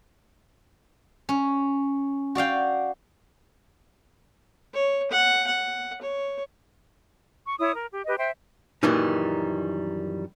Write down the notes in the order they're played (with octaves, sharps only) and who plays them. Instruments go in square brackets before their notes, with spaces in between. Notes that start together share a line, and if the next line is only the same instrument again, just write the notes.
[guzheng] C#4
F#4 D5 F5 G5
[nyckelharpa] C#5
F#5
F#5
C#5
[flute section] C#6
E4 C#5 D#6
A#4
G4
G4 B4 D#5
C5 E5 G5
[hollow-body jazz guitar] F#2 A#2 D#3 E3 G3 D#4